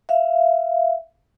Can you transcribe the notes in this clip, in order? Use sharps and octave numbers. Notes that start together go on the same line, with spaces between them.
E5 F5